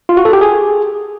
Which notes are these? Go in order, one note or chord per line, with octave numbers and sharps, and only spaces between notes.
F4
F#4
A4
G4
G#4